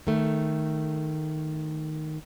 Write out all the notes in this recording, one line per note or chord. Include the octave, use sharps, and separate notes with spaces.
D#3 A3